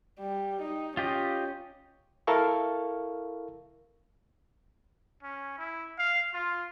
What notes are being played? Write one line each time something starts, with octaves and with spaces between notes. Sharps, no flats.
G3
D#4
C#4 F4 G4 D#5
E4 A4 A#4 F5 C#6
C#4
E4
F5
F4